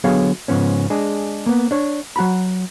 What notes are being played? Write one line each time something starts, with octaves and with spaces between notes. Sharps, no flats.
D3 F#3 B3 G#4 C#5 F5
G#2 C#3 F3 B3 C#4
G#3 D4 G#4
A#3 B3
D4 C#5
F#3 F#4 A#5 B5